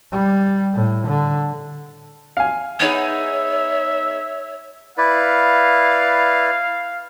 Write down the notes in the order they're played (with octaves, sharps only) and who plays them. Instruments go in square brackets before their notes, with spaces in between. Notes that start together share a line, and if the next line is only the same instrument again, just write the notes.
[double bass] G3
A2
D3
[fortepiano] F5 G#5
[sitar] B3 D#4 G#4 [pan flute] C#5 [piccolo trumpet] E5
[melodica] E4 B4 D5 [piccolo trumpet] F5